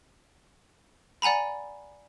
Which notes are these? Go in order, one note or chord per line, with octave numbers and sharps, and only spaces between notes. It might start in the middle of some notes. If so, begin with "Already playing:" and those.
D5 F#5 G#5 A#5 B5